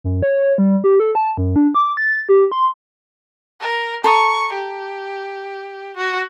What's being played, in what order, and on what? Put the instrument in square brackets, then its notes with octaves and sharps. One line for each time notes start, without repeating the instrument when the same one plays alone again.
[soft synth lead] F#2
C#5
G3
G4
A4
A5
F#2
D4
D6
A6
G4
C6
[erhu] A#4
[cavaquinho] A4 A#5 D#6 [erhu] C#6
[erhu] G4
F#4